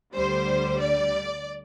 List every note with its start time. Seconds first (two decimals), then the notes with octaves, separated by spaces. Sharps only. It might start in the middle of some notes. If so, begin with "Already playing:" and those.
0.15 D2 D3 G3 C5
0.80 D5